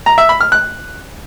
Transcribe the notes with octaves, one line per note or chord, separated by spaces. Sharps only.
A#5
E5
B5
F6
F#6